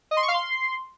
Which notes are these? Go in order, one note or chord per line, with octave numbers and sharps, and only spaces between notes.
D#5
C6
C#6
F5
C6